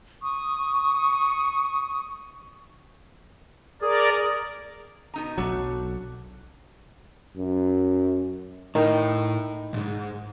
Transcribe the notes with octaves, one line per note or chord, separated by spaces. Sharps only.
C#6 D#6
G#4 A#4 D5
B2 D#4 A#5
B1 F#3 A3 D4 F#4
F#2
A2 D#4 A#4 G5
C2 G#2